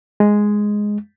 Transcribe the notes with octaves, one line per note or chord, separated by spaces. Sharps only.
G#3